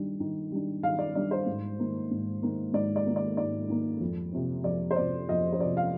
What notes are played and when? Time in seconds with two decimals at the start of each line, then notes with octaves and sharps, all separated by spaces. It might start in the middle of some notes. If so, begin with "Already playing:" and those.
Already playing: D#3 G3 D4
0.20 D#3
0.51 G3 D4
0.83 D#3 F5
0.99 D5
1.15 G3 D4 D5
1.31 C5
1.46 G#2
1.79 D#3 A#3
2.11 G#2
2.43 D#3 A#3
2.73 G#2 D5
2.96 D5
3.06 D#3 A#3
3.16 D5
3.37 G#2 D5
3.69 D#3 A#3
4.01 F2
4.32 C3 F3
4.64 F2 D5
4.91 C5
4.96 C3 F3 D5
5.29 F2 D#5
5.52 C5
5.60 C3 F3 D5
5.77 F5